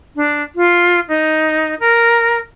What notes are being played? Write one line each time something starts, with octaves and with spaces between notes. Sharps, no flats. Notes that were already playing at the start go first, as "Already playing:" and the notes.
D4
F4
D#4
A#4